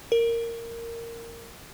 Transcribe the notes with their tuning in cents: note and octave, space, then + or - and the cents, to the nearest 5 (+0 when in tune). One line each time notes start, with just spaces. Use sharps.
A#4 -10